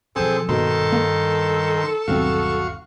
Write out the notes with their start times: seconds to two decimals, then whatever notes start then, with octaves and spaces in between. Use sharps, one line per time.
0.16 B2 F3 C4 G#4 A4
0.49 A#1 G2 B2 D#3 A4 C6
0.92 A#3
2.08 G1 D#2 B2 F#3 C4 F#4 F5 C#6